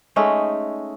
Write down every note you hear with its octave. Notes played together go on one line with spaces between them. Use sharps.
G#3 A3 C#4 D#4